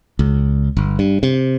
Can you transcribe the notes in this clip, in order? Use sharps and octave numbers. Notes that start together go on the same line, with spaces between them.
C#2
G1
G2
C3